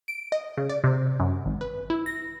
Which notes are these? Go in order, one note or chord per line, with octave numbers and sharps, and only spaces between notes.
D7
D#5
C#3
D5
C3
F#2
G#1
B4
E4
A#6